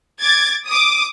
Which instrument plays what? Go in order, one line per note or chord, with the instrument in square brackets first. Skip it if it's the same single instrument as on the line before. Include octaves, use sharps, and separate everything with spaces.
[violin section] D6 G#6 A6
D6 D#6